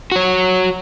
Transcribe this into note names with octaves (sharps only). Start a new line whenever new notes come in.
F#4 C#5